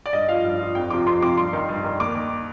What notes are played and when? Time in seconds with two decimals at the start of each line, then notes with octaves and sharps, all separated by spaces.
0.06 D5
0.13 G2 D#5
0.29 F3 F5
0.44 G2
0.60 F3
0.75 F2 G5
0.90 C3 F3 D6
1.06 F2 C6
1.22 C3 F3 D6
1.37 G2 C6
1.53 D#3
1.69 G2
1.84 D#3
2.00 D#2 D6
2.15 D#3